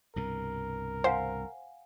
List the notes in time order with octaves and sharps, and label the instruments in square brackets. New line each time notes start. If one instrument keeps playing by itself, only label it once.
[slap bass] C2 G2 B2 [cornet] A#4
[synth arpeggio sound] C5 [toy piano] F5 F#5 G#5